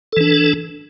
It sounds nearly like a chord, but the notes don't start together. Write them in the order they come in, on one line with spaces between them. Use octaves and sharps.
A4 E3 D4